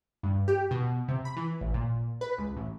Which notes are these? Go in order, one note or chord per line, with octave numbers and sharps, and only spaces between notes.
G2
G4
B2
C3
B5
E3
A1
A#2
B4
C#2
A1